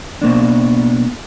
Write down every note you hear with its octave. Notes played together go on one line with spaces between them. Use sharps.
B2 A#3 D4